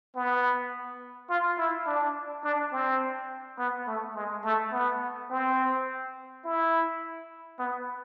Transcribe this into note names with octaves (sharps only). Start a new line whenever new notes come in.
B3
F4
E4
D4
D4
C4
B3
A3
G#3
A3
B3
C4
E4
B3